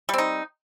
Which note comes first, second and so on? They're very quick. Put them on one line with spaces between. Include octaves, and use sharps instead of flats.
G3 C4 D#4